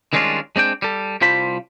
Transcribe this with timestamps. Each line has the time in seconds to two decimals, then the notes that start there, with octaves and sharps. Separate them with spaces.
0.13 D#3 G3 G#3 C#4 D4 F4
0.56 G#3 C4 D4 G5
0.82 G3 A4
1.21 C2 G3 F4 C5 A5 B5